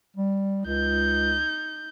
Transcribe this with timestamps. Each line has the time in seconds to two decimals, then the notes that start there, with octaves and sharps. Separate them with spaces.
0.16 G3
0.66 C#2 D#4 G6